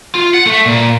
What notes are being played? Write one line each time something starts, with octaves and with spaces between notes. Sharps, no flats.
F4
F#5
A3
A#2